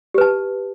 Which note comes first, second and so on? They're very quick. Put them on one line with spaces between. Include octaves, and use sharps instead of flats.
G4 B4 A5